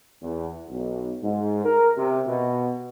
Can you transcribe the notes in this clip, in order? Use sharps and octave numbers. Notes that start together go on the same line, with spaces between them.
E2
B1
G#2
A#4
C3
B2